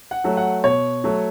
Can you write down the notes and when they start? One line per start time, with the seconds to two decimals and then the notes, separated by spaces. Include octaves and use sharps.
0.11 F#5
0.24 F#3 A3
0.37 F#5
0.64 B2 C#5
1.04 F#3 A3